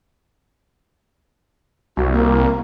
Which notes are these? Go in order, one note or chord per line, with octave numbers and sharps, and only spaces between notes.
C2 F#4
A#3